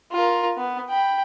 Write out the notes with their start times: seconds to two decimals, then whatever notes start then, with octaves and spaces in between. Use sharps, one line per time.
0.12 F4 A#4
0.58 B3
0.90 G5 B5